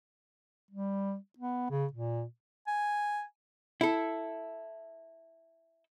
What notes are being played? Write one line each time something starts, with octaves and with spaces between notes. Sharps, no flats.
G3
B3
C#3
A#2
G#5
E4 A4